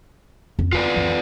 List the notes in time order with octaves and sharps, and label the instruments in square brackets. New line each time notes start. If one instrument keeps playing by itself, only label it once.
[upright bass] F2
[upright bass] G#3 [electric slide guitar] F4 B4 D5
[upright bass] F2 E3